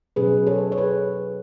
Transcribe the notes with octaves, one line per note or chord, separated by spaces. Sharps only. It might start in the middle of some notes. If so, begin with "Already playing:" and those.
B2 F#3 C#4 G#4 B4
A4 C#5
C#5
G#4 B4